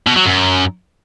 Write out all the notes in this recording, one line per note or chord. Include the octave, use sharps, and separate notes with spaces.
B2
F#3
F#2